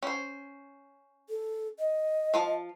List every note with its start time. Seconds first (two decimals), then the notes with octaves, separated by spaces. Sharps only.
0.03 C#4 C5
1.29 A4
1.79 D#5
2.34 F3 F4 A5